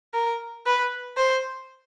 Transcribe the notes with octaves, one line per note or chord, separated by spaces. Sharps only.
A#4
B4
C5